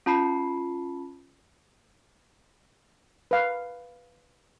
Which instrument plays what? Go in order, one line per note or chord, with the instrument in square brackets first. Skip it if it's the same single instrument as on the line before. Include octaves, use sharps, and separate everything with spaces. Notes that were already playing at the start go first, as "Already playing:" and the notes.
[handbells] C#4 F4 A5 B5 C7
[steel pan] B4 F5